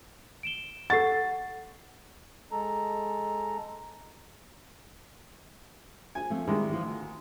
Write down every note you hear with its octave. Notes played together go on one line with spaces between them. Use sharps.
D7 E7 G7
A4 F#5 C#6 A6 C7
G#3 A4 A#5
G#5
F3 A3 C4
D#3 G3 G#3 E4 G4
E3 F3
D2